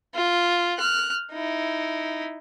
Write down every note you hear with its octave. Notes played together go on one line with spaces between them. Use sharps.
F4
F6 F#6
D#4 E4